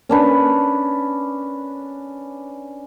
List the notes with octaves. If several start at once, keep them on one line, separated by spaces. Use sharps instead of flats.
C#4 D4 B4